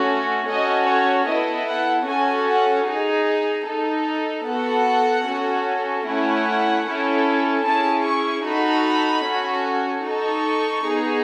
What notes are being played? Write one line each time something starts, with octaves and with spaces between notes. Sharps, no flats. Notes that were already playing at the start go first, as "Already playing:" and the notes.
Already playing: A3 C#4 F#4 A4
C#4 F#4 A4 D#5
C#5
B3 E4 A4 D#5
F#5
C#4 F#4 A4 G#5
F#5
D#4 G#4
D#4 A4
B3 F#4 A4 F#5
C#4 F#4 A4
A3 C#4 E4 F#5
C#4 E4 A4
C#4 E4 G#4 A5
C#6
D#4 F#4 A4 B5
C#4 F#4 A4
D#4 A4 C#6
B3 D#4 G#4